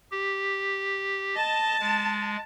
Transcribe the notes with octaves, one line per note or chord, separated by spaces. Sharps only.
G4
D#5 A5
G#3